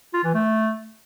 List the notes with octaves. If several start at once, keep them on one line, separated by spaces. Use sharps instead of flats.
F4
E3
A3